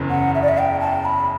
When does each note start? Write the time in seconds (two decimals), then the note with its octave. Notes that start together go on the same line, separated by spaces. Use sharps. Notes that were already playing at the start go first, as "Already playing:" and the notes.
Already playing: F#1 E2 C#3
0.10 F#5
0.35 E5
0.42 D5
0.49 E5
0.58 G5
0.81 A5
1.05 B5